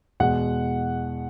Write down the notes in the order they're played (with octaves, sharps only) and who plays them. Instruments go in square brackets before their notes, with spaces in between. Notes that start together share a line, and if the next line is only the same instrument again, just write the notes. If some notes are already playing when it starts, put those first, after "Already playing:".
[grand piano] E2 B2 G#3 F#5